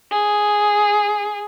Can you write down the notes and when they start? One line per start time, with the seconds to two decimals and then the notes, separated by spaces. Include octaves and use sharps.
0.11 G#4